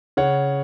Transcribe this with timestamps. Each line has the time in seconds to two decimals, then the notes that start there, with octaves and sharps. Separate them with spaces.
0.17 C#3 C#5 F#5